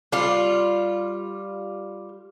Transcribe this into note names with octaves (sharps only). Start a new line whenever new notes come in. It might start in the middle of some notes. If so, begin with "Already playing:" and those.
G3 F4